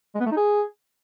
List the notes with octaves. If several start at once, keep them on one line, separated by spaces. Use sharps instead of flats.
G#3
B3
A3
D#4
G#4